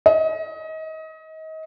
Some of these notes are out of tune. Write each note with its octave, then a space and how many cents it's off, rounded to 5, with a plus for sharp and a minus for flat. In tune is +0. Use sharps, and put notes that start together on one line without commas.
D#5 +30